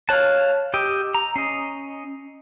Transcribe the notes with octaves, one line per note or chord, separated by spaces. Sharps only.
C#5 F5 A5 F#6
G4 D#5 G5 E6
A#5
C#4 D#5 C7